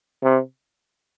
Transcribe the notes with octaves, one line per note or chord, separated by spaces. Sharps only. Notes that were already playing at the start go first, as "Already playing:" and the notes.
C3